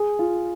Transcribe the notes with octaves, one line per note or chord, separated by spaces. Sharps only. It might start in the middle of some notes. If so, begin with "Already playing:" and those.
Already playing: G#4
F4